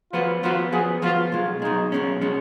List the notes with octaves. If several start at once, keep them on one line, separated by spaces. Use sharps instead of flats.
F3 B3 F4 F#4 B4
F3 B3 F4 F#4 B4
F3 B3 F#4 G#4
F3 B3 F4 F#4
B1 B2 G#3 F4
B1 B2 G#3 D#4
B1 B2 G#3 C#4
B2 G#3 C#4